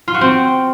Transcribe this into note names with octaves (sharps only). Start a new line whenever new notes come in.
F4
F#4
C4